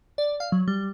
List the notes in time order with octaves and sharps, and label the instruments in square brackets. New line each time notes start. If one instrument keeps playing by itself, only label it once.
[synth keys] D5
F5
F#3
G3